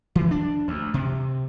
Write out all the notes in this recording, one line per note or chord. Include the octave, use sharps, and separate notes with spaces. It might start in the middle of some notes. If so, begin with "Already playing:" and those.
E3
D4
D2
C3